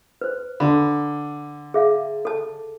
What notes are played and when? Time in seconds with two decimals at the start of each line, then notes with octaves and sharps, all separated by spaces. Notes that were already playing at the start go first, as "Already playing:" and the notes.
0.21 B4 C5
0.60 D3 B5
1.74 G#4 E5 F5
2.25 A4 A5